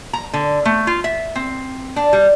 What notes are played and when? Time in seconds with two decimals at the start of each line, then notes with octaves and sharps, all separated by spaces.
0.13 A#5
0.34 D3
0.65 A3
0.87 F4
1.04 E5
1.35 C4
1.96 D4
2.13 G3